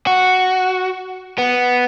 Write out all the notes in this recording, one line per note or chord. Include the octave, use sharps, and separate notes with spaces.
F#4
B3